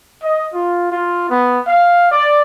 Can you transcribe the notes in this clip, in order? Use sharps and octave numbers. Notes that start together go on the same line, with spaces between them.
D#5
F4
F4
B3
F5
D5